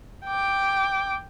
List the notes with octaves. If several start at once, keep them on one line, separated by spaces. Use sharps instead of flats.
G5 D6